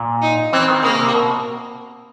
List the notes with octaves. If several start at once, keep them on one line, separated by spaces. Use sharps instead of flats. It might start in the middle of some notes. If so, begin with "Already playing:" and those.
Already playing: A#2
D#4
E3 C4
D#3
C#3 A#3
C3
B2